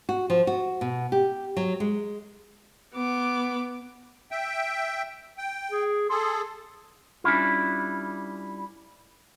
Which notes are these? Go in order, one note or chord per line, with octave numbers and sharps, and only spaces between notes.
F#4
F3
F#4
B2
G4
F#3
G#3
B3 D6
E5 G5
G5
G#4
G#4 A4 C6
G3 C#4 D4 E4 F4